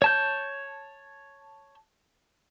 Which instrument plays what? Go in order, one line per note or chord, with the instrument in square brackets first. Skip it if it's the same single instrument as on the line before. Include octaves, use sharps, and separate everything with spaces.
[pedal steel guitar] C#5 A5 G6